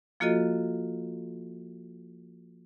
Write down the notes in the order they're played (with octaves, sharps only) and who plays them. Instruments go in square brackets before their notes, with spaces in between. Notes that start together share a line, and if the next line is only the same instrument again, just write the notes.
[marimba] F3 A#3 F4 F#4 A4 D#5